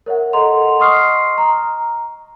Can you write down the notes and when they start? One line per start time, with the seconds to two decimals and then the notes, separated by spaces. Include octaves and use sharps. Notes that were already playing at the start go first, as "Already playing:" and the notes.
0.06 A#4 C#5 E5 F#5
0.33 A4 D#5 F#5 A#5 C6 F7
0.79 D#5 C6 C#6 D#6 F6 C7
1.38 A#5